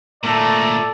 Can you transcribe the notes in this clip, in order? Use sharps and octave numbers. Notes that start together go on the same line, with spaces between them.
A#2 A3 A4 D5 A#5